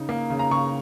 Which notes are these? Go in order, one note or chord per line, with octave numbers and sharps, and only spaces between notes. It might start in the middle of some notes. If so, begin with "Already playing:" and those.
Already playing: C#3 D#4
A#3
C#3
A#5
C#3 C#6